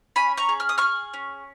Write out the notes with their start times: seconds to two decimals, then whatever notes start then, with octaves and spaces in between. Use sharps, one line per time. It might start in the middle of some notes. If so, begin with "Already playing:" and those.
0.16 C#4 G#5 B5
0.37 A#5 C#6
0.49 G#4
0.60 F6
0.69 D#6
0.78 G#4 C#6 F6
1.14 C#4